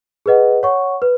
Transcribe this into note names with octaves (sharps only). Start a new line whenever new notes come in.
G#4 B4 D#5 F#5
C#5 F#5 C#6
B4